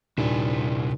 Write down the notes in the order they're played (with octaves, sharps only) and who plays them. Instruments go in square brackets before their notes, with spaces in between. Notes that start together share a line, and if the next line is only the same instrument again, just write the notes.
[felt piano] D#1 D4 [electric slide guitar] C3 E4 G#5